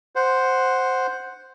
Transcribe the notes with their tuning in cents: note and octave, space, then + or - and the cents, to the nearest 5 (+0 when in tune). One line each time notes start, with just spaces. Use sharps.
C5 +0 F#5 +0